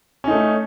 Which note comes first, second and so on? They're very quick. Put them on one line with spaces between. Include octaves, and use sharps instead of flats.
C#4 D#4 A3